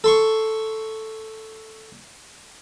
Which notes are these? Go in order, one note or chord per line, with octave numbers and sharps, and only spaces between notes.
A4 C6 C#6